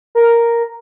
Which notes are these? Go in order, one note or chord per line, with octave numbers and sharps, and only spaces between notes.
A#4